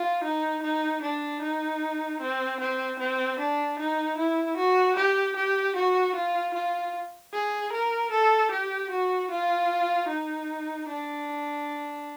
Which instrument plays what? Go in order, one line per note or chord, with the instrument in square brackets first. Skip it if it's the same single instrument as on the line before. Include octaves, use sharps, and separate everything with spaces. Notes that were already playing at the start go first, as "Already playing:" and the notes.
Already playing: [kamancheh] F4
D#4
D#4
D4
D#4
C4
C4
C4
D4
D#4
E4
F#4
G4
G4
F#4
F4
F4
G#4
A#4
A4
G4
F#4
F4
D#4
D4